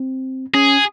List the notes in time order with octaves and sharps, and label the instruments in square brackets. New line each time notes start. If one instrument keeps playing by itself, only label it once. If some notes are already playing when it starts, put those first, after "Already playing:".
Already playing: [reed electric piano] C4
[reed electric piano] C#4 [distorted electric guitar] G#4